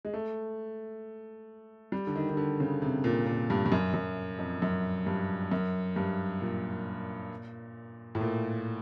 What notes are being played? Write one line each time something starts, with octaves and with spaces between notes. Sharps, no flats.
G#3
A3
G3
D3
D#3
D#3
D3
C#3
C3
A#2
A#2
G2
G2
F#2
F#2
F2
F#2
G2
F#2
G2
A#2
A2
A#2